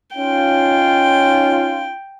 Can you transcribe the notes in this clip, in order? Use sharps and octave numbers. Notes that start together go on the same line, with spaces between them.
C#4 D#4 F4 G5